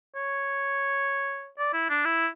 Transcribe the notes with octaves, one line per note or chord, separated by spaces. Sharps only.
C#5
D5
E4
D4
E4